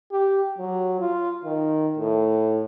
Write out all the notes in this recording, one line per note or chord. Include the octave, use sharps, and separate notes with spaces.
G4
F#3
F4
D#3
A2